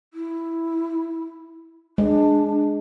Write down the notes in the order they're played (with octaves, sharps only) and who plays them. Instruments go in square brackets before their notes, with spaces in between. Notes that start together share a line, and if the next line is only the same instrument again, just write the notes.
[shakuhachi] E4
[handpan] G#3 [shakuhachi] D4